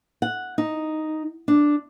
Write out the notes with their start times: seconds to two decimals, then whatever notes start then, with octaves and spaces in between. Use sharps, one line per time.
0.22 F#5
0.58 D#4
1.48 D4